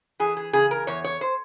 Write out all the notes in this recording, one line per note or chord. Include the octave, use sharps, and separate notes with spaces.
E3 G#4
G#4
C#3 G#4
A#4
E2 C#5
C#5
C5